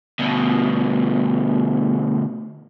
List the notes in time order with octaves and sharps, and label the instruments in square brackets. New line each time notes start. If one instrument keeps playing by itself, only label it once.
[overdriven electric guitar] D2 B2